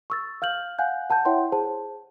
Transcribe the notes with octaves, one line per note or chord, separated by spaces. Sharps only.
C#6 E6 A6
F5 F6 G6 F#7
F5 F#5 G#5 F#6 G6
F#5 A5 B5 G6
E4 C#5 E5 F#5 G5 C6
G#4 C5 A5